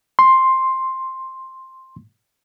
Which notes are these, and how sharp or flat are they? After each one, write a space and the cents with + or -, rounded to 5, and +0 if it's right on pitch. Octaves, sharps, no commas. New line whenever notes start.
C6 +10